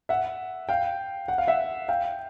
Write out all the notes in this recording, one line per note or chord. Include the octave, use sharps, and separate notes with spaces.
E5 F#5
F5 G5
F#5
F5
E5 F#5
F5 G5